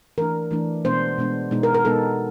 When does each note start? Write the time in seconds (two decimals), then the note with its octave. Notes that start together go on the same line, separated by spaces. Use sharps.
0.18 E3 A3 D4 A#4
0.51 E3 A3 D4
0.85 B2 G#3 B3 D4 C5
1.18 B2 G#3 B3 D4
1.51 B2 G#3 B3 D#4
1.63 A#4
1.74 A#4
1.85 B2 G#3 B3 D#4 A4